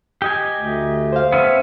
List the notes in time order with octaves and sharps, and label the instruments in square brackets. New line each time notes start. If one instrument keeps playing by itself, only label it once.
[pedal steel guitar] G4 D#5 G#5
[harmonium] D2
[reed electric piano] C5 F5
[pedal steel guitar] B3 C#4 E5